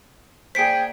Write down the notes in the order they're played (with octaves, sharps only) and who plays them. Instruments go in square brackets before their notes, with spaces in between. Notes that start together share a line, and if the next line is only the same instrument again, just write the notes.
[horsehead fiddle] A#3 D5 [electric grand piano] G#4 C5 [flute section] G5 G#5 [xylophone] B6 D7